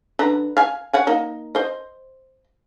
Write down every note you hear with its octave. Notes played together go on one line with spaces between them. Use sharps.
D3 B4 A#5
F5 G#5
C#5 F#5 G#5
A#3 D#4
C5 D#5